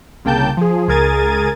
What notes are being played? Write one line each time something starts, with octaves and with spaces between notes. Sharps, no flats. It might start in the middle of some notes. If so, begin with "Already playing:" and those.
C2 C#3 A#3 G5 A5 G6
F3 G#4
C#2 G#4 A#4 G#6 A6 D#7